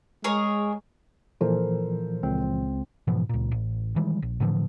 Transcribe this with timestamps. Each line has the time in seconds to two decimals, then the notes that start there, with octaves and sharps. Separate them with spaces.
0.24 G#3 G#4 A#4 C#5
1.41 A#2 E3 F3 A4 A#4 C5
2.23 C#2 C4
3.07 G#2 B2 E3 F3
3.29 C#2 A#2
3.52 A1
3.96 D#3 E3 G3 G#3
4.22 A#1
4.40 A2 D3 E3 F3